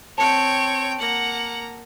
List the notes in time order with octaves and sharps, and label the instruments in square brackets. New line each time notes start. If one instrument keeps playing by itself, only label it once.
[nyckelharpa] C4 G5 [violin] C#5 [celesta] A5 C#7
[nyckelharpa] A#3 A#5 [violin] F#5